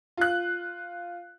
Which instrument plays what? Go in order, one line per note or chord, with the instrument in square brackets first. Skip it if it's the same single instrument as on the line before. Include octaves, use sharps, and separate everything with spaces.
[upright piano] F4 F#6